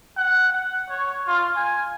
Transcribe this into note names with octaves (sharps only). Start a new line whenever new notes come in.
F#5
F#5
C#5
F4
G#5